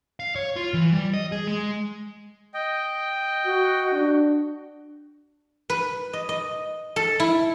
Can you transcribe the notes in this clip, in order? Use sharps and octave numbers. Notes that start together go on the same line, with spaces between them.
F5
C#5
F4
E3
G3
D#5
G#4
G#3
D#5 G5
F#4
D4
B4
D#5
D#5
A4
E4